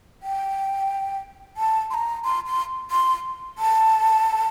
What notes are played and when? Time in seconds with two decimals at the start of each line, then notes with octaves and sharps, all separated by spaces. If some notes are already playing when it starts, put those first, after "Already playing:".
0.23 G5
1.57 A5
1.90 C6
1.94 A#5
2.24 C6
2.46 C6
2.91 C6
3.58 A5